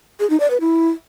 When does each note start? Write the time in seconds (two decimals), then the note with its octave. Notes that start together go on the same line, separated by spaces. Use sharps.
0.20 G#4
0.30 D#4
0.40 D5
0.50 B4
0.61 E4